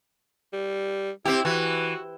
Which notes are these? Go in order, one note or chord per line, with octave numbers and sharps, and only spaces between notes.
G3
C4 E4 G4
E3 F#4